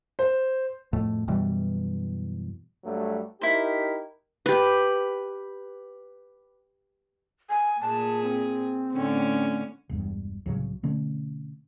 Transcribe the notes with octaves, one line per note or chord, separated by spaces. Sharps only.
C5
F2 A2 A3
F#2 B2 E3 G3
G2 F#3 A3
D#4 E4 G4 A#4 C5
G4 B4
G#5
A#2 G#4 A5
C4
A2 D3 C#4
E1 E2 G2
C2 A2 C#3 F#3
B2 D3 A3 C#4